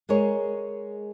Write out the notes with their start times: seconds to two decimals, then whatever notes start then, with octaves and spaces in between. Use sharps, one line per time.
0.09 G#3 G#4 A#4 C#5